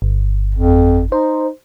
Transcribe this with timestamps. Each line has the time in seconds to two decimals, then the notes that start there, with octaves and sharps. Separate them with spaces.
0.02 G1
0.55 F2
1.12 D#4 C5